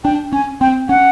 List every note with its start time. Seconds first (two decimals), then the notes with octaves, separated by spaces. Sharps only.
0.04 D4 G5
0.32 C#4 G#5
0.61 C4 G5
0.89 C#4 F#5